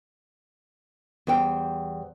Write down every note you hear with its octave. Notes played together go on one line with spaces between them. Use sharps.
E2 G3 C5 G5